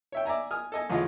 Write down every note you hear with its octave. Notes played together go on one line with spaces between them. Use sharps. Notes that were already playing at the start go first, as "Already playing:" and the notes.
C#5 E5 G5
D5 E5 G#5 A#5
G#5 D#6 F6
A4 D#5 G#5
A1 E2 F4 G#4 D#5 F5